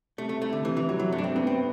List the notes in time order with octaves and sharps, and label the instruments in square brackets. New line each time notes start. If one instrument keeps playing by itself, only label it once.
[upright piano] C3 [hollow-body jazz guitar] A3
[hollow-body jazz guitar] A3
[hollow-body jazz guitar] A3 [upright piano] E4
[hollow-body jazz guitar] D3
[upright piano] C3 [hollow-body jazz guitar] E3
[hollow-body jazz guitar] E3
[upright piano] C3 [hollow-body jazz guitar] F#3
[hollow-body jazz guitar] F#3
[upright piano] G2 [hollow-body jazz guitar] A3
[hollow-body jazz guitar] D4
C4
[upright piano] B3 [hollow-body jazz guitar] C4
[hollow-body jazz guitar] C4